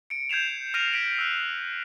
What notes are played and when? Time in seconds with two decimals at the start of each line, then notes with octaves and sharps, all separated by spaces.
0.10 C#7 D7
0.29 G6 G#6 C7 E7 F7
0.74 F6 A#6 C7 D7 D#7 F7
0.92 B6 D7 F#7
1.19 E6 F#6